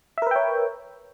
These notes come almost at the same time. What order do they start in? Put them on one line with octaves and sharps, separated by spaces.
E5 A#4 B4 G5 C#5